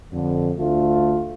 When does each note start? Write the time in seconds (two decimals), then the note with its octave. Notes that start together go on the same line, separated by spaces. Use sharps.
0.12 F2 D3
0.57 D2 A3 F4